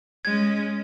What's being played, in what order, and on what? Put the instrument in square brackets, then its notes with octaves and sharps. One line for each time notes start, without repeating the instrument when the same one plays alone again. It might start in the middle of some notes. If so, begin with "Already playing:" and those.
[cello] G#3 C#4 [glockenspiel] G#6